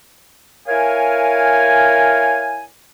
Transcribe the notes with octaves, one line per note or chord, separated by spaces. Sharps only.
E4 A#4 C#5 F5 G#5